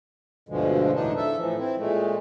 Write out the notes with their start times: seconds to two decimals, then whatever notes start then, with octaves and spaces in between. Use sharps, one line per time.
0.49 D2 G2 B2 D3 F3 G#3
0.93 E2 A2 D4 D#4
1.17 A4 E5
1.37 A2 E3 F3
1.58 C4 E4
1.78 A#2 G#3 A3